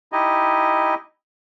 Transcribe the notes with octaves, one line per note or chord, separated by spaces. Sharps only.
D#4 E4 G4 D#5